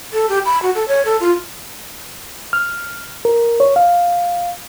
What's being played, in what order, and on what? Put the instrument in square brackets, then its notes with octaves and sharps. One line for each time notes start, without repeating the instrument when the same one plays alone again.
[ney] A4
G4
B5
F#4
A4
C#5
A4
F4
[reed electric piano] F6
A#4
C#5
F5